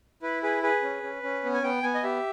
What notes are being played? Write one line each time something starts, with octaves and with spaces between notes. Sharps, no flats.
E4 B4
G#4 B4
G#4 B4
C#4
C#4
C#4
B3
G#5
B3 G5
B3 G#5
D#5
G4 E5